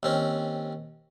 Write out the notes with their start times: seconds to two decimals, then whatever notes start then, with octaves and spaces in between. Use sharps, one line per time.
0.03 D#2 C4 C#4